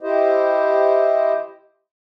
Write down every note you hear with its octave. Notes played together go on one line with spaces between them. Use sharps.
E4 G4 C5 D#5